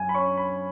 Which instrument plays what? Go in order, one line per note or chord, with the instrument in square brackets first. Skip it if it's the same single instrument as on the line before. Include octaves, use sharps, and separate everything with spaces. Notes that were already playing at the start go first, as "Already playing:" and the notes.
Already playing: [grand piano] F#2 G#5
B5
C#4 C#6
B5